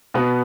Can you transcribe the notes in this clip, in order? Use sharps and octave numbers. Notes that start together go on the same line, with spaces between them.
B2 B3 B4